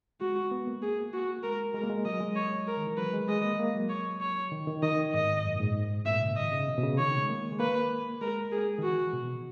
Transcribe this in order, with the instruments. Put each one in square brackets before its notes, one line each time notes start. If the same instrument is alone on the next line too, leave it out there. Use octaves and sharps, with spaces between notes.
[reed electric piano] G#3 [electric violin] F#4
[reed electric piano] B3
A#3
[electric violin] G#4
F#4
[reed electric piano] G#3 [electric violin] A#4
[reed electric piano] G#3 [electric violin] A#4
[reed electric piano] A#3
G#3
[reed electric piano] F#3 [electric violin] D#5
[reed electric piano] G#3
[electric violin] C#5
A#4
[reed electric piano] D#3
E3
[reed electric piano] F#3 [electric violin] B4
[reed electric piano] G#3
[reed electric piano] G#3 [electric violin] D#5
[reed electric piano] A#3
A#3
F#3
[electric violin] C#5
C#5
[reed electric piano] D#3
D#3
[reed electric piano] D#3 [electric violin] D#5
[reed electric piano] G#2 [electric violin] D#5
[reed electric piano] F#2
A#2
G#2
[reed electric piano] A#2 [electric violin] E5
[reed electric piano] C#3
[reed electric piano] D#3 [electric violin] D#5
[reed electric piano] C#3
B2
B2
C#3
[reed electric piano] D#3 [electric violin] C#5
[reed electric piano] G#3
A#3
G#3
[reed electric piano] A#3 [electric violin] B4
[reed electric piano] G#3 [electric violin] A#4
[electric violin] G#4
[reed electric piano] D#3
[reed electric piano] E3 [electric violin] F#4
[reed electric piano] B2